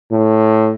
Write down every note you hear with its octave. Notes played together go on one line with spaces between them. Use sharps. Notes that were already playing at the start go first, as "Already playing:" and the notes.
A2